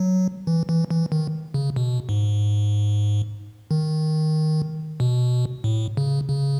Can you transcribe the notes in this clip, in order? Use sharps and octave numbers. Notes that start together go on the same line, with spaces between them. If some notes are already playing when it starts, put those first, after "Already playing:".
Already playing: F#3
E3
E3
E3
D#3
C#3
B2
G#2
D#3
B2
A2
C#3
C#3